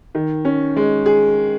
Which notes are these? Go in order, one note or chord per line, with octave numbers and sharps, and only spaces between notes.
D#3
C#4
G#3
G#4